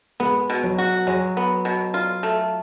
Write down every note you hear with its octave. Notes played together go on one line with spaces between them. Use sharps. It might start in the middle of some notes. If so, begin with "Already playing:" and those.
G#3 B3
B2
F#3
F#4
F#3 G#3
B3
B2
F4
A3